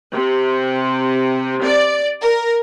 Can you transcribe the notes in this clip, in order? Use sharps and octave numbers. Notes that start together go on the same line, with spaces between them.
C3
D5
A#4